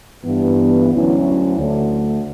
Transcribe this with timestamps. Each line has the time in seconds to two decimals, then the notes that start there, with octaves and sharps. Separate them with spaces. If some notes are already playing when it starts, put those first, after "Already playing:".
0.24 G2 E3 B3
0.90 D2 D3 F#3 C#4 E4
1.57 D2 D3 A3